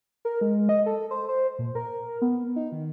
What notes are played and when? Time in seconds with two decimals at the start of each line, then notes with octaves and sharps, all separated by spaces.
0.25 A#4
0.41 G#3
0.69 D#5
0.86 A4
1.11 C5
1.29 C5
1.59 A#2
1.75 A#4
2.22 B3
2.56 D#4
2.72 D#3